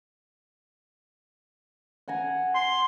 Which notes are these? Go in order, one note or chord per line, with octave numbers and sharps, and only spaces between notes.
F#5 G#5 A#5
C6